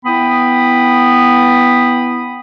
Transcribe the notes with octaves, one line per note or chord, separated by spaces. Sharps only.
B3 E4 G5 B5 D#6